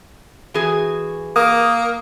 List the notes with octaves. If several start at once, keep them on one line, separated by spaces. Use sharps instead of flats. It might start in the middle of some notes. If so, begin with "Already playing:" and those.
E3 F#4 G#4
A#3 D#6